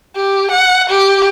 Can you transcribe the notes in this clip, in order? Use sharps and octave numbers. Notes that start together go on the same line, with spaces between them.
G4
F#5
G4